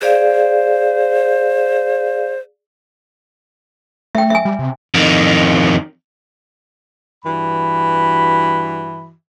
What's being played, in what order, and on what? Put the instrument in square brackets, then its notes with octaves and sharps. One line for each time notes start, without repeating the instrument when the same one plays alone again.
[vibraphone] G#4 D5 F5 [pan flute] C5
[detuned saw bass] A3 [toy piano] E5 G5
[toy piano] E5 G#5
[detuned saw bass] G3
C3
[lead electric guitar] F2 D#3
[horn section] G2 E3 F#4 B5